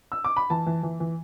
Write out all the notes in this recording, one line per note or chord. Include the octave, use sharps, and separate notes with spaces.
E6
D6
B5
E3 A5
E3
E3
E3